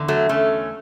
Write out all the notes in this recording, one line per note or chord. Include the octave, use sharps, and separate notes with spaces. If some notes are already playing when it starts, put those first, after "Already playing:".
Already playing: E2 D3
F#3 A3
A3 C#4